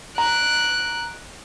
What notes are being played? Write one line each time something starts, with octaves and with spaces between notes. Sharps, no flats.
A#5 F#6 D7